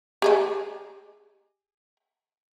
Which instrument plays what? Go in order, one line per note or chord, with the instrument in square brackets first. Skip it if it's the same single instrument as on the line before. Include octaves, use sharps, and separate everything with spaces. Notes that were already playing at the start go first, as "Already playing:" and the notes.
[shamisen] G4 G#4 D#5